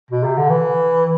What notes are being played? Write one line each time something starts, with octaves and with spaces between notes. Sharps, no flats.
B2
C3
D3
E3